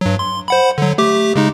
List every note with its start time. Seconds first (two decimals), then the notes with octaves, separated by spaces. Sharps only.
0.01 G2 F#3
0.19 C6
0.48 C5 F#5 B5
0.78 D3 F#3
0.98 A3 G4 D6
1.35 C#3 G#3 D#4